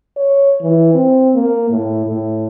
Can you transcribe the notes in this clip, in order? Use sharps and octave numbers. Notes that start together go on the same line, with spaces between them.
C#5
E3
C4
A#3
A2
A2